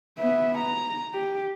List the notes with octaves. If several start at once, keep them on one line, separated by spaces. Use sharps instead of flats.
B3 E5
A#5
G4